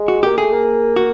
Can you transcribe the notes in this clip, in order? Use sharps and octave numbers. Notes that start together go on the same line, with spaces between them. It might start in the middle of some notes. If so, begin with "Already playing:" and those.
Already playing: G#3
F#4
A#3 G4
A3 G#4
A#3
F#4